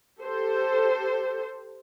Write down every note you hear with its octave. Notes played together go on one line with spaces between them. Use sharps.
G4 A4 C5